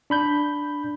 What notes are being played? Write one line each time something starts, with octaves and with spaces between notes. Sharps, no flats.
D4 B5 G6